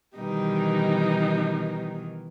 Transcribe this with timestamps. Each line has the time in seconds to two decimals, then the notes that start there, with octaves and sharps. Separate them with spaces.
0.17 B2 D#3 E3 G3 D#4